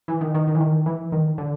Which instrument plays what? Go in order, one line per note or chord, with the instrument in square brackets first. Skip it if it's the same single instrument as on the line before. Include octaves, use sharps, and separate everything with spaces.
[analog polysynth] E3
D#3
D#3
D#3
E3
D#3
E3
D#3
D3